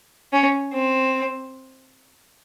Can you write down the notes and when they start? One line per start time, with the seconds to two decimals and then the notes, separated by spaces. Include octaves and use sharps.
0.33 C#4
0.73 C4